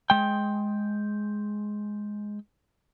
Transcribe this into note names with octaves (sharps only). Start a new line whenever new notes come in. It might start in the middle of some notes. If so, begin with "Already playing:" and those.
G#3 G5